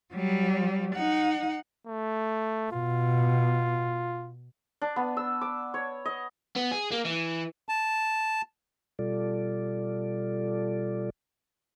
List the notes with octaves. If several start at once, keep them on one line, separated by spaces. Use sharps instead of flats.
F#3 G3
D#4 F#5
A3
B2 F4
D4
B3
E6
D6
C#5
D#5
B3
G#4
A#3
E3
A5
B2 G3 F4 A4 D5